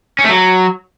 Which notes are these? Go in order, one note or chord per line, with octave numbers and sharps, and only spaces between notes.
C#4
A3
F#3